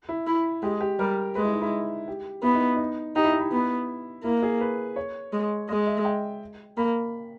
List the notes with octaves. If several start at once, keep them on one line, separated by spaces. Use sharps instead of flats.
E4
E4
G#3 G4
G4
G3 A#4
G#3 B4
E4
D#4
E4
G4
B3 E4
D#4
D#4
D#4 G4
E4
D#4
E4
B3
A#3 E4
G#4
B4
C#5
G#3
G#3 D#5
E5
G5
A#3 B5